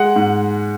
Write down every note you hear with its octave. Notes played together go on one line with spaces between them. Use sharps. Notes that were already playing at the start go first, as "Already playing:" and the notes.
Already playing: G#3 F#5
G#2